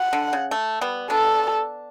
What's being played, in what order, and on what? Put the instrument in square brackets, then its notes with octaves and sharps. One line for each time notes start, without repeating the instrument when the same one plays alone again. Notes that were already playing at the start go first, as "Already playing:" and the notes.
Already playing: [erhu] F#5
[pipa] D3
C#3
A3
G3 B3
[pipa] B3 D4 [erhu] A4